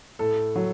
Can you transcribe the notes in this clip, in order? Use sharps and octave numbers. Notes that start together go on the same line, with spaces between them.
A2 A4
F#3 A3